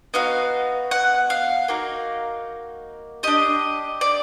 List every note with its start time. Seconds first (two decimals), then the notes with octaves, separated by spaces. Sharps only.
0.14 B3 D#4 F#4 F5
0.91 F#5
1.30 F5
1.68 A#3 D#4 F#4
3.23 D4 G4 D#5
4.01 D5